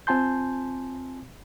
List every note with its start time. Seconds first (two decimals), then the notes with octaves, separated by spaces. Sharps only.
0.07 C4 F4 G#5 A5 C6 G6